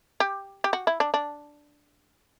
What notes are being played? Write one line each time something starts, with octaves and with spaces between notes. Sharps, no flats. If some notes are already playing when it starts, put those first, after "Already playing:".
G4
G4
F#4
E4
D4
D4